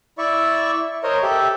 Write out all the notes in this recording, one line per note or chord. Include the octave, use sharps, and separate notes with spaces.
E4 D5 E5 C#6
A#4 C5 C#5 D#5
G4 A4 E5